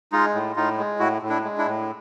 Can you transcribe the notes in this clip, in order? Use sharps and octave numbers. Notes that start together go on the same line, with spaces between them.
G#3 D#4 F4
A2
A2 D#4 F4
G#3
A2 E4 F#4
A2
D4 E4
G#3
D4 E4
A2